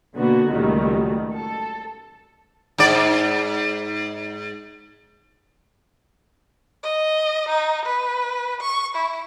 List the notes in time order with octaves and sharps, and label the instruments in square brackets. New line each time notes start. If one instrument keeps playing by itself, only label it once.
[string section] B2 D3 A#3 B3 F#4
C#2 A#2 D#3 F#3 G3 A3
A4
[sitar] G#2 D5
[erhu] D#5
D#4
B4
C#6
E4